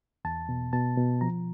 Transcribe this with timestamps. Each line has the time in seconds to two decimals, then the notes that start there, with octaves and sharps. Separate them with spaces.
0.25 E2 A5
0.49 B2
0.73 B2 A5
0.97 B2
1.21 F3 A#5